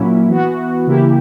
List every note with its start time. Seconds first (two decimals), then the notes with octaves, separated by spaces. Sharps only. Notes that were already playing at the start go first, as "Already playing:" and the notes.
Already playing: A#2 F#3 A#3 C#4 E4
0.27 E3 B3 F#4
0.87 C#3 E3 A#3 E4 G4